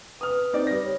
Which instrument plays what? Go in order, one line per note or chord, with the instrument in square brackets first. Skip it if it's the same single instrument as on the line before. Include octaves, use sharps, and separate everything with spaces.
[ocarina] B4 [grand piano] D#6 F6
[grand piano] C4 D#4 D5
G3 A#6
[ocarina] C#5